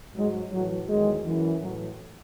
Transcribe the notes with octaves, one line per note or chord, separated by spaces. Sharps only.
G#2 F#3 G#3
A2 E3 F#3
E2 D#3 F#3 G#3
F#2 E3
A2 E3 F#3